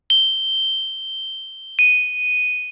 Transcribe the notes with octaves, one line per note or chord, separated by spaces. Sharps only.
G7
D#7